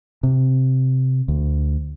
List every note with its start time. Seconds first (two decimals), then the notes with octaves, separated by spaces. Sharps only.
0.23 C3
1.28 D2